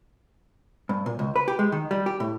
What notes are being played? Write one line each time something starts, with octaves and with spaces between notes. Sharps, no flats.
G2
A#2
C#2
B4
G4
G#3
D#3
G3
G4
A2